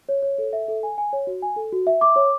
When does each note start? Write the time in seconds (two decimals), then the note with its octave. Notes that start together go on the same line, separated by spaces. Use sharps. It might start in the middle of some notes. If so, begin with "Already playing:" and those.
0.09 C#5
0.23 C#5
0.38 A4
0.53 E5
0.68 A4
0.83 G#5
0.98 G#5
1.13 C#5
1.27 F#4
1.42 G#5
1.56 A4
1.72 F#4
1.87 E5
2.01 D6
2.16 C#5